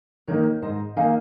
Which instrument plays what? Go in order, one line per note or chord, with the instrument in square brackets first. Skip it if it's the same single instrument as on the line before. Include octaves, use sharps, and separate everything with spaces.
[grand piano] D#3 A#3 D#4 [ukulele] A#4 C#5
[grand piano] G#2 [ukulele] C5 D#5
[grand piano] D#3 A#3 D#4 [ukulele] F5 G#5